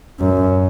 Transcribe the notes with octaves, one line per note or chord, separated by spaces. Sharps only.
F#2